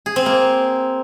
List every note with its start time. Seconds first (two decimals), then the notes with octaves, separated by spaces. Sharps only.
0.06 G#4
0.16 C4
0.26 A#3